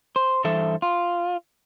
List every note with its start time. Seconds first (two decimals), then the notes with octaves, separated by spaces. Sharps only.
0.16 C5
0.44 G2 E3 A4 C5 E5
0.82 F4